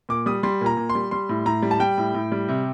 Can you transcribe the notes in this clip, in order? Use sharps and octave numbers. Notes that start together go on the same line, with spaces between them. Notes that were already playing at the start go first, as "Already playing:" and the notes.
A#2 D6
G3 D#6
G3 C6
A#2 A#5
A#2
C6
G3
G3 C6
A2
A2 A#5
G3
A5
G3 G5
A2
A2
G3
C3